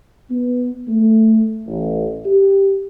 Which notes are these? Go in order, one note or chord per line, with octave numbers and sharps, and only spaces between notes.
B3
A3
A1
G4